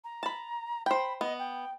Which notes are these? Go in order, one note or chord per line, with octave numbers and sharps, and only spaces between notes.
A#5
A5 B5
C5 G5 B5
B3 D#5
G5